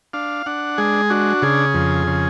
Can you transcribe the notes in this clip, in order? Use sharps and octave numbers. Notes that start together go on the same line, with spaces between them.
D4 F5
D4 F#5
G#3 G#4
D4 F#4
C#3 G#4
F2
C#3